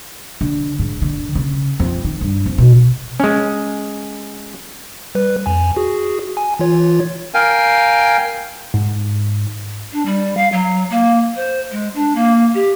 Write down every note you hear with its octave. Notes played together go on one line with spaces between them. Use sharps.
D3
G#2
D3
C#3
F2
D#3
G2
F2
B2
G#3 C#4
G3 B4
F2 G#5
F#4 G#4
G#5
E3 F4 C#5
A#4 F5 G5 G#5
G#2
D4
G3
F5
F#3
A#3
C5
G#3
D4
A#3
G4